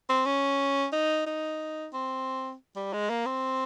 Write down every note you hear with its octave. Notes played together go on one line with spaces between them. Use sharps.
C4
C#4
D#4
D#4
C4
G3
G#3
A#3
C4